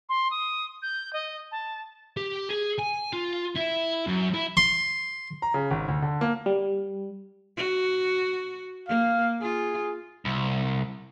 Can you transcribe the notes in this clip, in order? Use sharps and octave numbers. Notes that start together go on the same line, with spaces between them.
C6
D#6
G6
D#5
A5
G4
G#4
G#5
F4
E4
F#2
E4
C6
A#5
C#3
G#1
D2
D3
A#3
G3
F#4
A#3 F5
F4 G#4
C2